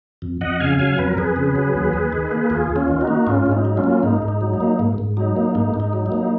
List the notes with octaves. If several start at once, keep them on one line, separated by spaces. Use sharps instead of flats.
F2
F2 D#5 F#5
C#3 F5 G#5
F#3 F5 G#5
F2 B4
A#4
F2 G#4 B4
C#3
F#3
D#2
D#2
D#3
A#3
D#2 F4 G#4
D#2
C#4 F4
D#3
D#4 F#4
A#3
G#2 C#4 F4
G#2
D#4
F#3
C#4 F4
A#3
G#2 D#4
G#2
D#4
F#3
D#4
A#3
G#2
G#2
F#3 D#4
A#3
G#2 D#4
G#2
D#4
F#3
D#4
A#3